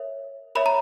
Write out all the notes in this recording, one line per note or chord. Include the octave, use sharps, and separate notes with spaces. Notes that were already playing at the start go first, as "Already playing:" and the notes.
Already playing: A#4 C#5 E5
A#4 C#5 E5 B5
A#5